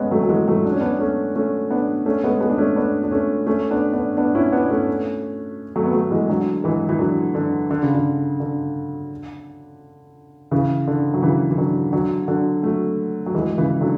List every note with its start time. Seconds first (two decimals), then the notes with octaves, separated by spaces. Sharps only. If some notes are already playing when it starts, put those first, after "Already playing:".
Already playing: G#3 A3 B3 C#4
0.11 F#3 A3
0.24 F#3
0.29 E3 G#3
0.48 F#3 A3
0.65 D4
0.72 C#4
0.81 B3 D4
1.00 A3 C#4
1.35 A3 C#4
1.70 B3 D4
2.06 A3 C#4
2.24 G#3 B3
2.40 G#3 B3
2.49 D4
2.58 A3 C#4
2.76 B3 D4
3.04 D4
3.11 A3 C#4
3.47 A3 C#4
3.71 B3 D4
3.93 B3 D4
4.17 B3 D4
4.35 C#4 E4
4.52 B3 D4
4.70 A3 C#4
5.76 F#3 A3
5.85 B3
5.93 F#3 A3
6.11 E3 G#3
6.29 D3 F#3
6.64 E3 G#3
6.89 E3
6.99 D3 F#3
7.35 D3
7.71 D3
7.83 C#3
7.95 D3
8.40 D3
10.51 C#3 E3
10.87 D3
11.14 F#3
11.22 C#3 E3
11.51 E3
11.58 D3 F#3
11.92 D3 F#3
12.28 D3 F#3
12.63 F#3 A3
13.26 F#3
13.35 E3 G#3
13.58 C#3 E3
13.81 D3 F#3